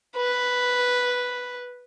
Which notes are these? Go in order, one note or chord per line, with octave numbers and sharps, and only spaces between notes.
B4